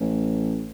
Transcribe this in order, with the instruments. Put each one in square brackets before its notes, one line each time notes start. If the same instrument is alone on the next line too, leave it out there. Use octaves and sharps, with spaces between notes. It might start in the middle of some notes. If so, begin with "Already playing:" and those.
[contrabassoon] A1